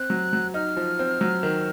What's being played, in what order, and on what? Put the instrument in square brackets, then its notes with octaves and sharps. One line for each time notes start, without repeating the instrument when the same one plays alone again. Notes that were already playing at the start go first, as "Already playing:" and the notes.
Already playing: [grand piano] C4 [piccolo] F#6
[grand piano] F#3
F#3
[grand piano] D#4 [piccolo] F6
[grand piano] F3
C4
F#3
D#3